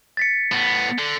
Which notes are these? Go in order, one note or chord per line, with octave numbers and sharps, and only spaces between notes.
A6 B6 C#7
A2 B3
D3